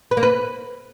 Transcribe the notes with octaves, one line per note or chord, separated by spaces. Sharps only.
B4
A#3
B4